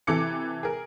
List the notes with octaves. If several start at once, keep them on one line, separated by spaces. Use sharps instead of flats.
C3 E3 A4 D6 C#7
G#4 A#4